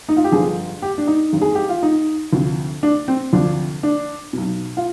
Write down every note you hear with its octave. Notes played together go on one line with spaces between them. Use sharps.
D#4
F4
G4
G1 G2 D3 F3 G#4
G4
D4
D#4
G#1 G2 D#3
G#4
G4
F4
D#4
D2 C3 F3
D4
C4
D2 C3 F3 D4
D4
B1 B2
F4